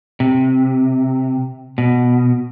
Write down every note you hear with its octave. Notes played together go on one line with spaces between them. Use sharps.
C3
B2